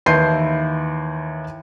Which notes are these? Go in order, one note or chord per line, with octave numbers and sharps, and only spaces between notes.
D#2 E3 E4 C6 G6 C7